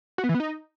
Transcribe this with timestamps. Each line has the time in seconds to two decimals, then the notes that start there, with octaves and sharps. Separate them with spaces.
0.18 F#4
0.24 B3
0.29 E3
0.34 B3
0.40 D#4